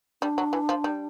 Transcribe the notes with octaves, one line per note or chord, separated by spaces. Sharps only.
G3 D4
F#3
E3
F3
G3